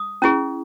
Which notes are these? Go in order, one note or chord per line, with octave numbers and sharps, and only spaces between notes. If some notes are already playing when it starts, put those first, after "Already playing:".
Already playing: D#6
C#4 E4 G#4